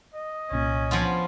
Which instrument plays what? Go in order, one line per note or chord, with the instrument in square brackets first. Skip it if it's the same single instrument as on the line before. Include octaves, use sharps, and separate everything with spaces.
[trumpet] D#5
[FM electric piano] C2 A#2 [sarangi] C#4
[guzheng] F3 B3 F4